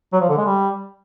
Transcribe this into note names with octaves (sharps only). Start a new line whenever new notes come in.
F#3
F3
D3
G#3
G3